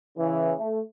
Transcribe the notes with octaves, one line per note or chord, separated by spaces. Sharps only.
C#3 E3
A3